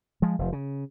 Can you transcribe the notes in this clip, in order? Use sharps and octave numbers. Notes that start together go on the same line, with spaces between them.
F3 G#3
F1 F3
C#3